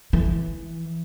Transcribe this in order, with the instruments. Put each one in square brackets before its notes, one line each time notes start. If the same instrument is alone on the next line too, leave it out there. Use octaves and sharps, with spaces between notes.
[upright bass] E3